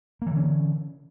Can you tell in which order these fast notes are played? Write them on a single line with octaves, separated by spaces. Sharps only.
A#3 E3 D3 C#4